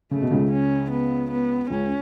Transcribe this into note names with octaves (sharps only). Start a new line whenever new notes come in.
C#3 A3
B2
C#2 C#3
C#4
B3
B3
C#2 C#3 C#4